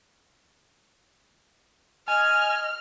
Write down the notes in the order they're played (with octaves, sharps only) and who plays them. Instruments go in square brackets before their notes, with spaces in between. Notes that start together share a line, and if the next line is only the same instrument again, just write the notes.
[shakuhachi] D#5 [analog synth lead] G#5 [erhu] F6